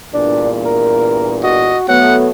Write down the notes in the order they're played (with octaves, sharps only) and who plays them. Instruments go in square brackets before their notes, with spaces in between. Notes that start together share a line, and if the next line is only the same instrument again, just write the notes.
[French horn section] E2 G2 A#2 [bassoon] D4
[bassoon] A#4
[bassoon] F#4 [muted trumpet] D#5
[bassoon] F#3 [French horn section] A3 B3 [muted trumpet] F#5